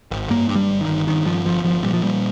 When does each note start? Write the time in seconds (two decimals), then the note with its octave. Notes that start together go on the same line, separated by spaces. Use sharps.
0.11 G#1
0.30 G2 A#3
0.49 G2
0.55 G3
0.69 G1
0.81 D#3
0.88 G1
1.07 G2 D#3
1.26 G2 F3
1.45 G1 F3
1.64 G1 F3
1.83 A#2 G3
1.93 F3
2.03 A#2 G3